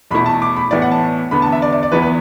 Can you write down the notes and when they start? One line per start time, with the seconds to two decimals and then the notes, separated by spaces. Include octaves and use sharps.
0.11 E2 B2 A3 E4 B5
0.26 A5
0.42 D6
0.56 B5
0.71 A2 E3 B3 E4 D5
0.82 F#5
0.92 A5
1.31 E2 D3 B3 B5
1.42 A5
1.52 E5
1.62 D5
1.72 D5
1.83 D5
1.92 E2 E3 B3 E4 B4
2.02 B4